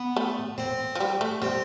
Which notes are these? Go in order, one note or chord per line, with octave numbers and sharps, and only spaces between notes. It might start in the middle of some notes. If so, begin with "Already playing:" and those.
Already playing: B3
A3
C4
F3
G3
A3
G3 C4